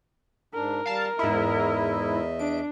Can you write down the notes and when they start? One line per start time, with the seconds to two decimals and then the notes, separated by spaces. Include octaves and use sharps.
0.54 G#2 D4 A#4
0.86 G3 F5 A5
1.19 E2 G#2 E4 D#5 E5
2.39 D4 D7